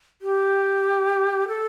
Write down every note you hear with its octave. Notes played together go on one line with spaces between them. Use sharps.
G4
A4